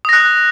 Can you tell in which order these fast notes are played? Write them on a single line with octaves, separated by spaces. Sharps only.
D#6 A#6 F#6